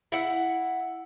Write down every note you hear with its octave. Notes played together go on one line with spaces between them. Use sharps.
E4 F#5